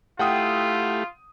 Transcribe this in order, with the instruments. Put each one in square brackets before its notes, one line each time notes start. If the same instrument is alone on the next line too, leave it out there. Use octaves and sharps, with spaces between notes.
[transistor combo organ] A3 E4 G4 [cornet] F4 [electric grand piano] F#5 G5 D#6